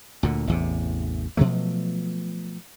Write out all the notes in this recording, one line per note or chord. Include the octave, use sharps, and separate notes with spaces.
D2 A#2 D3
A1 E2 C3
B2 F3 F#3 A3